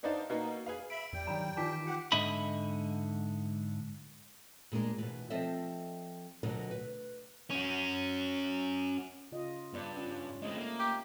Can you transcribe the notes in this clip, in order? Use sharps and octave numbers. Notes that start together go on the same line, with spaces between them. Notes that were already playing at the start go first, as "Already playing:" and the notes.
B3 D4 D#4 C5 D5 F5
B2 A#3 B3 D#4
G#4 B4 F5
E5 B5 D7
E2 G3 G5
G2 D#3 F#3 A#5 B5
D#3 E3 D#4 F4 G#5 D6 B6
G4 F#5
G#2 D3 D#5 E5 B5
A#2 G#3 D4 A#4
B2 E3
F3 C4 A4 D#5 E5
D2 B2 D3 F#3 A#4 D#5
B4
C#4 F#4
C#3 F4 D#5
G2 B3 D5
C#4 F4
G#3 A3 C4 D#5
A#3
G4